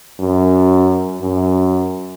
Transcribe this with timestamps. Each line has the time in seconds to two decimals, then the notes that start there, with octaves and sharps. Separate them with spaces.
0.19 F#2
1.21 F#2